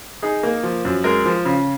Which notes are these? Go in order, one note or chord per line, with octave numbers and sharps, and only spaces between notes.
D#4 G#4
A#3
F3
F#2
G#3 A#4
F3
C#3